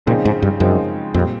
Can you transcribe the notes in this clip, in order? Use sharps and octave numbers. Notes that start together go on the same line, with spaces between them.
A#2 C#3 F3 G#3 C4 D#4
G#2
G2
F#2 C#3 F3 G#3 C4 D#4
F2 A#2 G3 C4